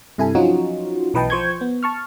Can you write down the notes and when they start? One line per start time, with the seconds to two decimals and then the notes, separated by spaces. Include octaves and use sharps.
0.18 G2 C3 E4 A4 G#5
0.35 F3 F#3 C#4 D#4 F4 F#4
1.14 B1 E3 B4 D#5 G5 A5
1.30 F3 C5 C#6 G6 G#6
1.61 B3
1.83 A5 C#6 F6